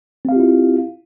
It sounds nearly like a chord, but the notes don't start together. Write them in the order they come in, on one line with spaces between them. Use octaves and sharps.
C4 F5 G4 F4 E4